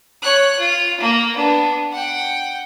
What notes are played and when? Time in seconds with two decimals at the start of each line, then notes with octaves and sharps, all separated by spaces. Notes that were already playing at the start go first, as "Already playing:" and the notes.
0.22 C#5 F#6
0.58 F4
1.00 A#3
1.35 B3 D4
1.92 F#5 G5